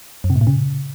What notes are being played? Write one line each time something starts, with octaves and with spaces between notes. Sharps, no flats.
F#2
C3
A2
A#2
C#3